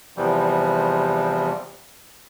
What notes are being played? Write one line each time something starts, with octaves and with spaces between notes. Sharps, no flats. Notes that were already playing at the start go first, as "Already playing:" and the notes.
E2 C3 E3 F3 G3